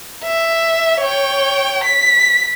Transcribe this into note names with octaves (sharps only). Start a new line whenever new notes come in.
E5
C#5 G5
B6